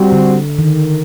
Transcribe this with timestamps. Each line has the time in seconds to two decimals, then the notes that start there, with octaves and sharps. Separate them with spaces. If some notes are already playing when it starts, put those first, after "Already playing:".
Already playing: G3 C4 F#4
0.12 D3
0.59 D#3